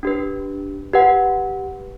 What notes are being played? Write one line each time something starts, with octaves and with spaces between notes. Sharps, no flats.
D4 G4 B4
G4 B4 F#5